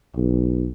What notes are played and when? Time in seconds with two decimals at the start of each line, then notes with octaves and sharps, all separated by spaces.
0.16 B1